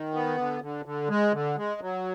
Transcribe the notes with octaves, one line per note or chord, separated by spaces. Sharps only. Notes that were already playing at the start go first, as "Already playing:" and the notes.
Already playing: D#3
B3
D3
D3
D3
G#3
D3
G#3
F#3